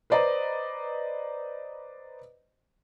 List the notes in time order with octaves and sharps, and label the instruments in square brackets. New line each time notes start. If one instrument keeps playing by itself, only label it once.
[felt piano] B4 C5 D5 D#5 A#5